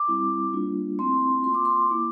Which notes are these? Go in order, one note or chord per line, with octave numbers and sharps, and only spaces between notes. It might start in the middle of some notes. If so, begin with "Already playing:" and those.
Already playing: D6
G3 C4 E4
G3 A#3 D4 F4
A3 C4 E4 C6
C6
A#3 F4 C6
D6
C6
A#3 E4 D6